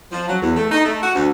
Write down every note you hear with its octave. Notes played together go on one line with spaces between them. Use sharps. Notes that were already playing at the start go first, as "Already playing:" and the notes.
F3
F#3
E2
A3
D#4
A3
F#4
D2